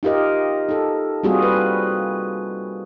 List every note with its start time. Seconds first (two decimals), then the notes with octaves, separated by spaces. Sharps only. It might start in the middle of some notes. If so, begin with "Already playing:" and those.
0.03 D#4 F4 G4 A#4 D#5
0.69 D#4 A4
1.23 G3 A#3 C4 F4 F#4 G#4
1.42 B4